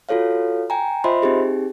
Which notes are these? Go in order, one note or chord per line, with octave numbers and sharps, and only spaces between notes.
F4 F#4 A4 C#5 F5
G5 G#5 A#5
F4 C5 D#5 E5 B5 C6
C4 D#4 G4 G#4